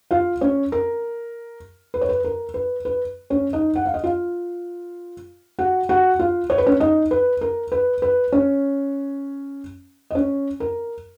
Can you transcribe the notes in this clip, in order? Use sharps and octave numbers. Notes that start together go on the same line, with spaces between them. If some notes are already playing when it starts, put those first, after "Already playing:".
F4 F5
C#4 C#5
A#4
B4
C#5
B4
A#4
B4
B4
C#4 C#5
D#4 D#5
F#5
F5
D#5
F4 F5
F#4 F#5
F#4 F#5
F4 F5
C#5
B4
C#4 C#5
D#4 D#5
B4
A#4
B4
B4
C#4 C#5
D#5
C#4 C#5
A#4